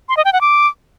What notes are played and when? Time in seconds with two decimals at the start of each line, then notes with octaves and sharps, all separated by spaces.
0.09 C6
0.17 D#5
0.25 G5
0.33 F#5
0.41 D6